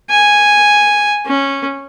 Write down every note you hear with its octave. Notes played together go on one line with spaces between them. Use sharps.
G#5
C#4